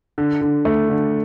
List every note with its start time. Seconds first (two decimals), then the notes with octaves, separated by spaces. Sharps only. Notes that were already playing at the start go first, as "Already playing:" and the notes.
0.18 D3
0.41 D3
0.65 A3
0.89 D3